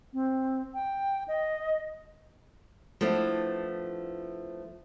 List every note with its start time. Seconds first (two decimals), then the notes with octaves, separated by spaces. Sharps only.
0.13 C4
0.74 G5
1.28 D#5
3.01 F3 A3 B3 D4 E4